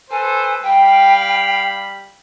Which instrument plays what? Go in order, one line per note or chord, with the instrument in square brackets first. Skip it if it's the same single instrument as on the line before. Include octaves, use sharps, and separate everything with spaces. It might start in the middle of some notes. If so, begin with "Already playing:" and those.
[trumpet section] A4 B4 C5 [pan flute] G#5
[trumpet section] G3 F5 B5 [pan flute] G5